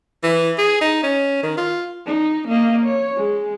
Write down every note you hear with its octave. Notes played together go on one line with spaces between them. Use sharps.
E3
G#4
D#4
C#4
D#3
F4
D#4
A#3 D#5
C#5
G#3